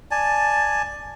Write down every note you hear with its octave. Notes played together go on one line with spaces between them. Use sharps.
D5 G#5 A5